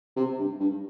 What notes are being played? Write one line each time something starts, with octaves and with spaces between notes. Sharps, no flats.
C3
G2
G2